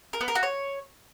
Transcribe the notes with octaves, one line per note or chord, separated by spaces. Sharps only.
A#4
B3
A#4
F#4
C#5